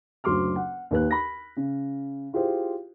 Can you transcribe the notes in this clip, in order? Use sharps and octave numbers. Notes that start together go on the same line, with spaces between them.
F#1 D2 F#3 C6 D6 F6
F#5
D#2 B4 F#6
B5 A#6
C#3
E4 F4 G4 G#4 C5